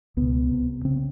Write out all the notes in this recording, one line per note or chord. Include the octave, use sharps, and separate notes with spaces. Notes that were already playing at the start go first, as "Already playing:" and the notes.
C#2 B2 B3
C2 C3
C#3 C4